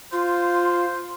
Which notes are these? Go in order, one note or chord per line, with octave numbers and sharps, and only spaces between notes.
F4 C5